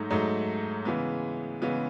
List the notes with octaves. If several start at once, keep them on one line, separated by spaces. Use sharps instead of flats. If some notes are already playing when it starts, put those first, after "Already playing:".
Already playing: G#2 F#3 A3 D#4
G#2 F#3 A3 D#4
C#3 E3 G#3 B3
C#3 E3 G#3 B3